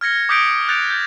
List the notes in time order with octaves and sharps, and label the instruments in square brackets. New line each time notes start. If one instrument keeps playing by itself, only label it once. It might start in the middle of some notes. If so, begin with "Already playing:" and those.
[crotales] F6 G#6 A#6 C#7
D6 D#6 G6 B6 C#7 D7
F#6 G6 A6 C#7 D7 F7
G6 A6